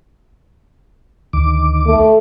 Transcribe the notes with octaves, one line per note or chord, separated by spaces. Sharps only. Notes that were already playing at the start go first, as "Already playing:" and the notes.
D2 D#3 D6
A3